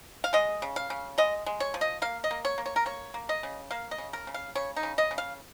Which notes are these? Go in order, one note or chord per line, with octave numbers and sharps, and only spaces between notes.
F5
G#3 D#5
C#3
F5
C#3
G#3 D#5
G#3
C#5
F3
D#5
A#3 F5
D#5
A#3
C#5
A#3
C#5
A#4
A#3 C#5
A#3
D#5
C#3
A#3 F5
D#5
C#3
A#4
C#3
F5
C#3 C#5
D#4
C#3
D#5
C#3
F5